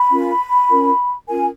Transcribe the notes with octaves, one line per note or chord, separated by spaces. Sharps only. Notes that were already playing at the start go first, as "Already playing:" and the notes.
Already playing: B5
C#4 F4 A#4
C#4 F4 A#4
C#4 F4 A#4 G#5